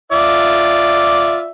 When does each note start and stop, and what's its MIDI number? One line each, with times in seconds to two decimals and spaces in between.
0.12 1.52 65
0.12 1.52 74
0.12 1.52 76